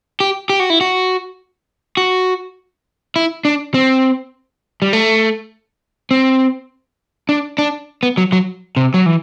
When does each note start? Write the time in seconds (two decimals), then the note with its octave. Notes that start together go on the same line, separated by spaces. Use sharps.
0.20 G4
0.49 G4
0.60 F#4
0.70 E4
0.81 F#4
1.97 F#4
3.16 E4
3.45 D4
3.74 C4
4.82 G3
4.93 A3
6.11 C4
7.29 D4
7.58 D4
8.03 B3
8.17 F#3
8.32 F#3
8.77 C3
8.94 F#3
9.06 E3